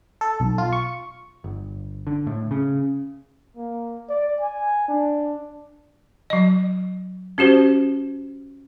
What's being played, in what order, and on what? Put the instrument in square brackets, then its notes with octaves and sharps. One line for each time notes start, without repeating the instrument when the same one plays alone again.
[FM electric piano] A4
B1
F4
C#6
[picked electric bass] G1
D3
A2
C#3
[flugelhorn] A#3
D5
G#5
D4
[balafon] F#3 D#5
C#4 F#4 G4 C5